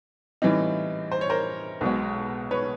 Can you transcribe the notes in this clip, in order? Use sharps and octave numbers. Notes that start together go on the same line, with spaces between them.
A2 E3 G3 C4 D#4
C5
C#5
A#4 C5
B1 B2 G#3
B4 C#5